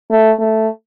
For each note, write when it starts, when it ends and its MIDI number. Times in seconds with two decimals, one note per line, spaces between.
0.10 0.31 57
0.39 0.68 57